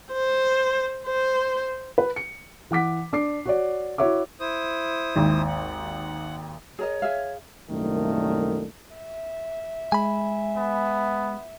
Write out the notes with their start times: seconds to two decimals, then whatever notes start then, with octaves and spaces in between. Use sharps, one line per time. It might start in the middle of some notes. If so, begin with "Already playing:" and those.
0.12 C5
1.06 C5
1.98 B4
2.16 C#7
2.71 E3 F#5 D6 B6
3.13 D4 D6 C7
3.45 F#4 C#5 D5
3.98 E4 F#4 C#5 E5 D6
4.40 E4 C5 D#6
5.16 G#1 D#2
5.47 F#5
6.79 G#4 A#4 C#5 D#5
7.02 G#4 E5 F5
7.70 C2 F#2 A#2 D#3 A3
8.95 E5
9.92 G#3 G#5 B5
10.57 B3